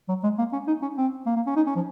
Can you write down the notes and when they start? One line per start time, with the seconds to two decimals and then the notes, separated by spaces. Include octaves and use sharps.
0.09 F#3
0.23 G#3
0.38 A#3
0.53 C#4
0.68 D#4
0.82 C#4
0.98 C4
1.26 A#3
1.36 A#3
1.47 C#4
1.56 D#4
1.67 C#4
1.76 F3